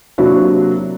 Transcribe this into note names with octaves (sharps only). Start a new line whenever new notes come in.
C3 F#3 A#3 D4 E4 F#4